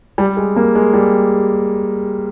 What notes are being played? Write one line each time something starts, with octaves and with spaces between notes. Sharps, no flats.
G3
G#3
A#3
G#3
G3